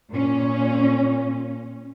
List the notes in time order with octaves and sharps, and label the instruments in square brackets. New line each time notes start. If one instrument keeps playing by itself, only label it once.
[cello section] A#2 C#4